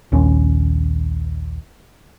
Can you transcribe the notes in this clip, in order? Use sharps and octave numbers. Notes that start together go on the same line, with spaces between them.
A#1 D#2 C#4